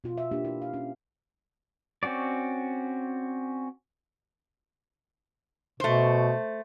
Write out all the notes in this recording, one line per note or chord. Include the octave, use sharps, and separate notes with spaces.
B2 F4
E5
A#3 D4 F4 G4
E4
F5
C#4
C4 C#4 F#4 D5
B2 A3 C5